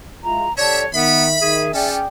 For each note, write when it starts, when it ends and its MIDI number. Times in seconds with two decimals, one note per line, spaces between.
0.24 0.46 56
0.24 0.46 64
0.24 0.46 65
0.24 0.56 82
0.57 0.86 50
0.57 0.86 67
0.57 0.88 73
0.57 0.86 74
0.57 0.80 76
0.57 0.86 81
0.93 1.35 51
0.93 1.26 59
0.93 1.88 76
0.93 1.65 83
1.41 1.73 51
1.41 1.72 68
1.74 2.02 61
1.74 1.95 62
1.74 1.95 65
1.74 2.07 68
1.74 1.95 69
1.74 2.07 74
1.74 2.07 79